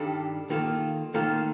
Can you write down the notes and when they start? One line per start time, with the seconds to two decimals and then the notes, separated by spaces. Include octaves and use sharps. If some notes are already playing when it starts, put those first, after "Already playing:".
Already playing: G2 D#3 G3 D4 A4
0.50 D#3 A#3 F4 A4
1.14 D#3 A#3 F4 A4